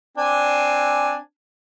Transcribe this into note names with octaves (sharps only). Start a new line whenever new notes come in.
C4 D4 G#5